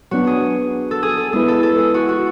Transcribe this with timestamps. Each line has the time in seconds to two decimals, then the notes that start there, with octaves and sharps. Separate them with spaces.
0.11 F#3 B3 D4 F#4
0.27 G#4
0.91 A4
1.03 G#4
1.17 A4
1.33 G#3 B3 E4 G#4 B4
1.48 A4
1.63 A4
1.78 G#4
1.94 F#4
2.09 F#4